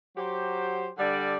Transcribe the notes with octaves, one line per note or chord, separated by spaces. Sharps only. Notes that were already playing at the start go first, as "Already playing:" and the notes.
F#3 G4 C5
D3 G3 D5